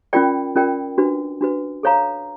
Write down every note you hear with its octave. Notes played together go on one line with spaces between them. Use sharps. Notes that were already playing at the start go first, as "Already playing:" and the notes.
C#4 F4 A#4 D5 G5
C#4 F4 A#4 D5 G5
D4 F#4 B4
D4 F#4 B4
A4 C#5 F5 A#5